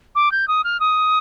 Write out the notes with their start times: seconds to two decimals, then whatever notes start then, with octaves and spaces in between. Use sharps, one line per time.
0.15 D6
0.32 G6
0.48 D#6
0.64 F6
0.80 D#6